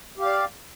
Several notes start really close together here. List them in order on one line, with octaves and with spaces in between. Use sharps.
G4 F5 D5